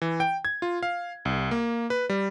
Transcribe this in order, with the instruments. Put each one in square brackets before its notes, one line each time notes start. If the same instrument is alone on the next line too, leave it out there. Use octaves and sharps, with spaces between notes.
[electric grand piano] E3
G5
G#6
F4
F5
C2
A#3
B4
G3